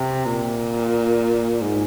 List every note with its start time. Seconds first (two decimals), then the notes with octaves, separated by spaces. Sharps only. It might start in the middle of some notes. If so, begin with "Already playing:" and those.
Already playing: C3
0.26 A#2
1.61 G#2